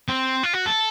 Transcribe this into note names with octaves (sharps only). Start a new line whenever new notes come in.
C4
F4
F#4
A4